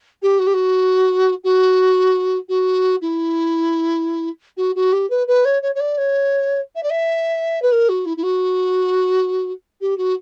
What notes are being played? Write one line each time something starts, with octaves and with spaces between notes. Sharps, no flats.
G4
F#4
G4
F#4
F#4
F#4
E4
F#4
F#4
G4
B4
B4
C#5
C#5
C#5
D5
C#5
E5
D5
E5
B4
A#4
F#4
E4
E4
F#4
G4
F#4